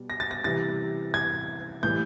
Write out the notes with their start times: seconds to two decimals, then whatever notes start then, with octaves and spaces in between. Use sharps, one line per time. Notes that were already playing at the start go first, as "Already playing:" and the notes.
Already playing: B2 G3
0.10 A#6
0.20 A6
0.31 A#6
0.44 C3 E3 G3 A6
1.14 G#6
1.83 A2 E3 G3 G6